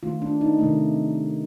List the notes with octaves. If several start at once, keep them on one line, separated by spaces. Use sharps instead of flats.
D#3 A3 F4
D4
D#4
C3 D#3 A3